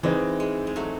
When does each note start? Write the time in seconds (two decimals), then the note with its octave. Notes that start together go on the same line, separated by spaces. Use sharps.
0.03 E3 G#3 C4 D#4
0.40 G#3
0.67 G#3
0.76 F#3 A3